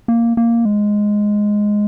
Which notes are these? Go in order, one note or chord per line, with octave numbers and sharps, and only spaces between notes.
A#3
A#3
G#3